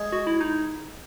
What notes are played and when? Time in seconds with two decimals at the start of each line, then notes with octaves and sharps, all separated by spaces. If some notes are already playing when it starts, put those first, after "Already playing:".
Already playing: G#3
0.13 F#4
0.27 E4
0.41 D#4